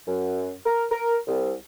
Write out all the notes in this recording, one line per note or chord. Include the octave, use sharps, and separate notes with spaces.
F#2
A#4
A#4
C2